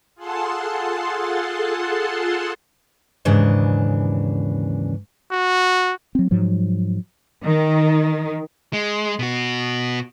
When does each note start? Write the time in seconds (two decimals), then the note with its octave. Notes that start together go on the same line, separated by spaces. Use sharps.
0.15 F4 G#4 A4 F#5 A5 C6
3.25 D#2 G#2 C#3 E3 D4
5.31 F#4
6.15 F#3 C4
6.31 G#2 F3 F#3
7.43 D#3
8.73 G#3
9.19 B2 F#4